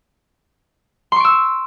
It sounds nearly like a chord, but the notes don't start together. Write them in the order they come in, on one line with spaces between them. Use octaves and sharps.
C6 C#6 D7 E6